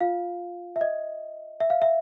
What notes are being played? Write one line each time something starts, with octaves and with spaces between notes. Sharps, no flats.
F4 F5
E5
D#5
E5
F5
E5